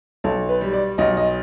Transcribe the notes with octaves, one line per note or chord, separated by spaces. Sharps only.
B1 A4
B4
G3
D5
B1 D#5
D#5